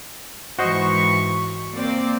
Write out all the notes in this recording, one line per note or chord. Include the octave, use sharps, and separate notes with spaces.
G#2 E3 F#4 C5 D#5 C#6
A#3 C4 D5